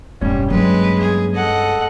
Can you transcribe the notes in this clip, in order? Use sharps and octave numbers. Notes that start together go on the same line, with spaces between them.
E1 G2 G3 C#4
F#3 G#3 A#3 B4
G#4
A4 D#5 F#5